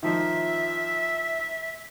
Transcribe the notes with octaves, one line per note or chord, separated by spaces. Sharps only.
D#3 F3 D#4 E5